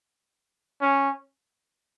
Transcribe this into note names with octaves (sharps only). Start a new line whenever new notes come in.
C#4